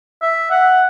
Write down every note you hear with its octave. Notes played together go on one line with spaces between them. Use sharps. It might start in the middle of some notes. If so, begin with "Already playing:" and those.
E5
F#5